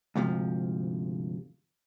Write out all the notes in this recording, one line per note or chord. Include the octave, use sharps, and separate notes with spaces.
D2 G#2 C3 F3